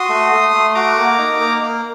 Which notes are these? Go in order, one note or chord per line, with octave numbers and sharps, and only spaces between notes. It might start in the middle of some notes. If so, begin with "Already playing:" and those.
Already playing: F#4 C6 D#6
A3
A3
A3
F#4 A#5 D6
A#3
D#4
A#3
A#3